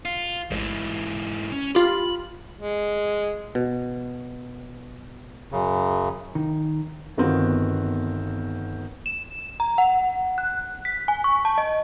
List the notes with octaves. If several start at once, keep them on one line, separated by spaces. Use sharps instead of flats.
F4
A1 G#2 E3
C#4
F4 G4 B5
G#3
B2
F#2 C#3
D#3
G1 D#3 B3 C4 F4 F#4
E7
A#5
F#5
F#6
B6
G#5
C#6
A5
D#5